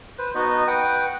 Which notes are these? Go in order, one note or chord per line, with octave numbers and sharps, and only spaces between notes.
B4 C5
B3 D#4 F#4 D#5
B4 F#5 G5